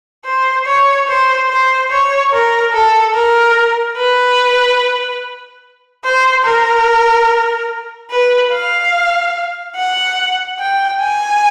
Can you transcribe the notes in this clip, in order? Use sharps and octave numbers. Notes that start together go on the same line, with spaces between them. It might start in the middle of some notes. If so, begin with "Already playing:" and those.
C5
C#5
C5
C5
C#5
A#4
A4
A#4
B4
C5
A#4
B4
F5
F#5
G5
G#5